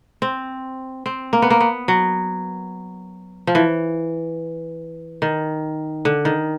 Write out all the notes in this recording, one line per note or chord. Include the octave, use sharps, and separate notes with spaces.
C4
C4
A#3
B3
A#3
B3
F#3
F3
E3
D#3
D3
D#3